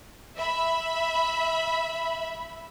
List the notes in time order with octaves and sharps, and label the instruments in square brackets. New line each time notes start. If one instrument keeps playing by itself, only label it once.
[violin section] E5 B5